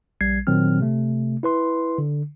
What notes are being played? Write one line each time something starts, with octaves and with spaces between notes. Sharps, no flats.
A#1 G3 G#6 C7
A#2 D#3 F#3 C4 F6
C3 A3
E4 B4 C6
D3